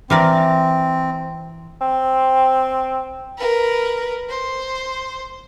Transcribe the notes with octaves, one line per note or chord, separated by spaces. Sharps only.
E3 C4 A#4 D5
C4
A#4 B4
C5